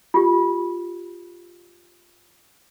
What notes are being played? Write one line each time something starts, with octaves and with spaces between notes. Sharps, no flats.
F4 G4